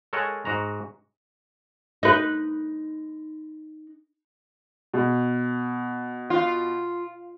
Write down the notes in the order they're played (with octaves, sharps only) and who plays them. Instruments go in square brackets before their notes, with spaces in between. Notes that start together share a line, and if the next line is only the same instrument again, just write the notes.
[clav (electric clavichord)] G#3 A4 A#4 C#5 F#5 G#5
G#2 F#4 A#5
[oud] D#4 B4
[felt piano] B2
[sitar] F4